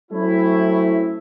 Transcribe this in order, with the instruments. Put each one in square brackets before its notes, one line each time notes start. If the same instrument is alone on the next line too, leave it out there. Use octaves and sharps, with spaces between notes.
[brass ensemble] F#3 A3 C4 C#4 E4